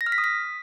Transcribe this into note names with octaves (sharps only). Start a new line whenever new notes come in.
A#6
F6
B6
D#6
B6